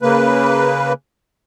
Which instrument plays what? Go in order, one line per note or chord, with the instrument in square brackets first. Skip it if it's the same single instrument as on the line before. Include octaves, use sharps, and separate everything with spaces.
[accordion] C#3 A#3 B4